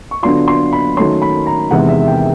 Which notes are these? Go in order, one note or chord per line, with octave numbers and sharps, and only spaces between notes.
C#6
D3 F#3 B3 D4 F4 C6
C6
B5
D#3 F#3 A3 C#4 C6
B5
A#5
E2 C3 D#3 G#3 B3 F#5
E5
G5